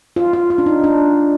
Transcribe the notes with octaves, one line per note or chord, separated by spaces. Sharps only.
F4
F4
F4
D4
D#4
D4